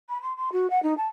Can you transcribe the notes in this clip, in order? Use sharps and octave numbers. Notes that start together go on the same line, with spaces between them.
B5
C6
C6
F#4
F#5
D#4
A5